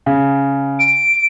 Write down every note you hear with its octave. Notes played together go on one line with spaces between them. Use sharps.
C#3
D7